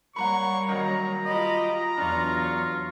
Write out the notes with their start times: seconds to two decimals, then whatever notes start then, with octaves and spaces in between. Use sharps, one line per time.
0.16 G3 A#3 C#5 F#5 A#5 B5 C#6
0.69 D#3 F#3 A#5
1.26 F4 G4 D#5 B5
1.98 E2 F#3 D4 F4 C#6